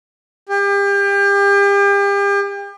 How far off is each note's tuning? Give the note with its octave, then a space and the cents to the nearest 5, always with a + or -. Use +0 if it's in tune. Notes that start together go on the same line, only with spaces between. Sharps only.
G4 +35